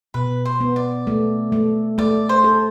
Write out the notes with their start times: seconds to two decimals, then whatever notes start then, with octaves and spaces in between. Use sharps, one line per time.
0.14 B2 B4
0.45 C5
0.60 B3
0.76 D5
1.07 A3
1.52 A3
1.98 A3 D5
2.29 C5
2.44 A4